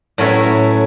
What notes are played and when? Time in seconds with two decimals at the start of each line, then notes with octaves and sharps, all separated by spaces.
0.18 A2 F#3 C#4 E4 B4